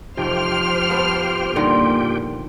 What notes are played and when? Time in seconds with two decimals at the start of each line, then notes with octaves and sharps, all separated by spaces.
0.17 F1 F4 G4 C5 G5 F6
0.89 F3 B3
1.56 G2 A#2 D3 D#3 C6